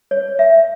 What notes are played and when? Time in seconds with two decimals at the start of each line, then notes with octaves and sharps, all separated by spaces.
0.11 C#5
0.39 E5